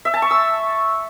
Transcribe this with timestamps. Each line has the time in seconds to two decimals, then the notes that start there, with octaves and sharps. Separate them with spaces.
0.05 E5
0.14 A5
0.22 C#6
0.31 E6